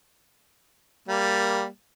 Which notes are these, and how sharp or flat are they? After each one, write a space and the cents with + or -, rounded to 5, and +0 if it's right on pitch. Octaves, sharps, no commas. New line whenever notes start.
G3 +0 A#3 +0